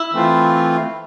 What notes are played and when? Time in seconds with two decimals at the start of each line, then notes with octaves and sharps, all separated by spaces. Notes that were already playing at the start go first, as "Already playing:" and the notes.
Already playing: E4
0.13 E3 A3 C4 F4